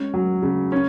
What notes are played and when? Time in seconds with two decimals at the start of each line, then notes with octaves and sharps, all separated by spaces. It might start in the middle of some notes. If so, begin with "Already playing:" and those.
Already playing: G#3 C#4
0.14 F#3
0.43 C#3
0.72 C#4